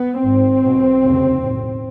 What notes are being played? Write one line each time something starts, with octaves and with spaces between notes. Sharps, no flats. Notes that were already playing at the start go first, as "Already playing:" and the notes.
Already playing: B3
G#1 G#2 C4
B1 B2
F1 D#2 C#3
B1 A2